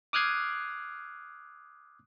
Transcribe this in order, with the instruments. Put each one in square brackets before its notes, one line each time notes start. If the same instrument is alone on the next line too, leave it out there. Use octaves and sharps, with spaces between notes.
[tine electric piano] D6 D#6 F6 F#6 G#6 C7